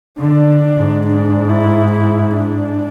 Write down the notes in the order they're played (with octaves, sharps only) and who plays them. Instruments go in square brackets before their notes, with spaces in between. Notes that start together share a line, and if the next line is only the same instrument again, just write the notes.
[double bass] D3 [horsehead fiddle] D4
[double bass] G#2
[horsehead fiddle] D4
E4
E4
D4